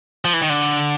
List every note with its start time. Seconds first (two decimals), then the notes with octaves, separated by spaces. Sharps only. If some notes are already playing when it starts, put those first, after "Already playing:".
0.25 F3
0.33 E3
0.41 D#3
0.50 D3